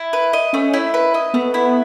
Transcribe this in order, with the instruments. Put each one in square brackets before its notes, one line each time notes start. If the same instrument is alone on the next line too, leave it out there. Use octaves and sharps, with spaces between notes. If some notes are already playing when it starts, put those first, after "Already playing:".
Already playing: [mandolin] E4
B4
D#5
[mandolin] A3 [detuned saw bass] C#4
[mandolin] E4
B4
D#5
[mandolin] A3 [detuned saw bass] B3
[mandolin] E4